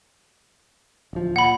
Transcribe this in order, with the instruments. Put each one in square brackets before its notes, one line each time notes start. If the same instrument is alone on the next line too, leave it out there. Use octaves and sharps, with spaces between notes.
[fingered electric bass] D1 F3
[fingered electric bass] A#2 [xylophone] F#5 B5